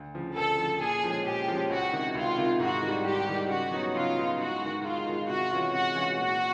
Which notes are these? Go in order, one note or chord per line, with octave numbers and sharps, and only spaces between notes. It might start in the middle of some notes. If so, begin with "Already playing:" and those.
Already playing: D2
C#3 F3
D2 A4
C#3 F3
A#2 G#4
F3 G#3 C#4
A#2 G4
F3 G#3 C#4
C#2 F#4
C3 D#3
C#2 F4
C3 D#3
G#2 F#4
D#3 G3
G#2 G4
D#3 G3
C#3 F#4
F#3 B3 D#4
C#3 F4
F#3 B3 D#4
G#2 F#4
D#3 G#3
G#2 F4
D#3 G#3
C3 F#4
E3 G#3 C#4 F4
C3 F#4
E3 G#3 C#4 F4
A#2 F#4